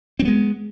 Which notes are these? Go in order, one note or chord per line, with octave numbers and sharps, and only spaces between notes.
F#3 G#3 B3 C4